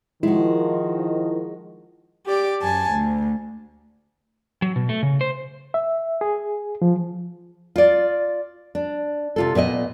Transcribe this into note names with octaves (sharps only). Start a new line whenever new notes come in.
D#3 F3 G#3 E4 F#4
G4 D5 D6
F#2 G#5 A5
D2
F#3
B2
A3
C#3
C5
E5
G#4
F3
F4 D5
D4
C3 F4 A4
A#2 B3 D5 D#5